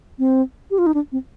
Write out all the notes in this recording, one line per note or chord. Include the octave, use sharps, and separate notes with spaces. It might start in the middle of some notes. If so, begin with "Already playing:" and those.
C4
G4
F4
D#4
D4
C4